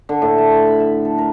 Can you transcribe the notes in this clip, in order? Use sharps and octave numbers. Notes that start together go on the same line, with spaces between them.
D3
A2
A5
C6
B5
E5
A4
A#4